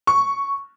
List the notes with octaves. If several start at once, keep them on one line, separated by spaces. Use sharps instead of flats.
C#6